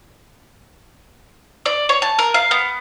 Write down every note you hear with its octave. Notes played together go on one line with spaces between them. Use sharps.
D5
C#5
A5
A#4
F5
B3